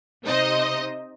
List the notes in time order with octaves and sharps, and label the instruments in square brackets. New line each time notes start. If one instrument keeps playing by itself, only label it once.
[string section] C3 D#4 C5 D#5